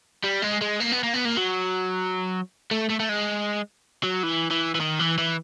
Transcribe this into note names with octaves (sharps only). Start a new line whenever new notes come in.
G3
G#3
G#3
A#3
B3
A#3
B3
A#3
F#3
A3
A3
A3
G#3
F#3
E3
E3
E3
D#3
E3
E3